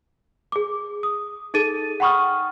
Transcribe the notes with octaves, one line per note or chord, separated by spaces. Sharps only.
G#4 D6
D#6
D#4 G#4 A4 A6 D#7
F#5 G5 B5 C#6 D#6 F6